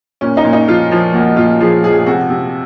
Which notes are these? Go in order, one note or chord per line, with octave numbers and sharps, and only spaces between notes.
A#2 C#4
D#4
A#2
D#4
F3 F4
F3
A#2 F#4
A#2 F4
F3 G#4
F3 G#4
G#4
C3 F#4
C3